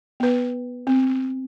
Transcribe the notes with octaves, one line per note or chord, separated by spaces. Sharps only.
B3 B4
C4